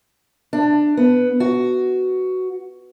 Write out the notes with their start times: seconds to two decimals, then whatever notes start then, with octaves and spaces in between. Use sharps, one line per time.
0.53 D4
0.97 B3
1.40 F#4